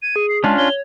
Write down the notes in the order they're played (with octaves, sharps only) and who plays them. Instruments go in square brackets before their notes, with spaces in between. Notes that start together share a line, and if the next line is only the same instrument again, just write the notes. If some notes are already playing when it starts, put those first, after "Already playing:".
[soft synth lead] G#6 [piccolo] D#7
[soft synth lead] G#4
[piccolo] C7
[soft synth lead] G#3 [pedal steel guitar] C#4 D4 F4 [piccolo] A5
[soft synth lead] C#5 [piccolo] G7